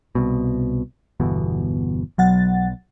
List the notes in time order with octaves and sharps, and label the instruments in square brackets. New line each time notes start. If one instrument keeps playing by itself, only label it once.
[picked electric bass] C2 B2
G1 E2 B2
[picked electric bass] B1 [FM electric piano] F#3 F#5 A6